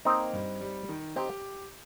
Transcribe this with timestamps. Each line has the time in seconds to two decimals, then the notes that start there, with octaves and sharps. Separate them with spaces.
0.05 A#3 C4 D#4
0.33 G2
0.61 G3
0.89 D#3
1.16 C4 D#4 G4